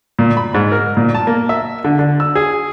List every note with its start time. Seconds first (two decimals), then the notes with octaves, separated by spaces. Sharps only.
0.19 A#2
0.37 B5
0.54 G#2
0.72 A#4
0.97 A#2
1.15 A5
1.27 A#3
1.49 E5
1.84 D3
1.99 D3
2.20 E6
2.35 G#4